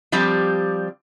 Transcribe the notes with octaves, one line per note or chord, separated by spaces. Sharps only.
F3 G3 C4 G4